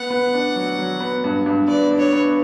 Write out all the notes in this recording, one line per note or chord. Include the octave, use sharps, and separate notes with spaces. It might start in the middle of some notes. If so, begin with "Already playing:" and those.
Already playing: B3 F#5
B3
D4
F#3
F#3
B3
G2
G2
B3 D5
D4
C#5
B3